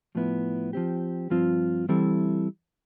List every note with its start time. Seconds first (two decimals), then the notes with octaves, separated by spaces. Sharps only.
0.15 A2 F3 B3 E4
0.73 F3 C4 G4
1.30 G2 F3 C4 F4
1.89 E3 G3 C4 E4 A4